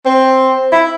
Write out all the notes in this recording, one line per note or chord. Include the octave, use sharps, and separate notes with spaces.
C4
E4